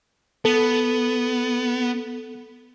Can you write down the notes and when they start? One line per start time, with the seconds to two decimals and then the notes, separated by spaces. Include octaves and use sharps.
0.45 B3 A4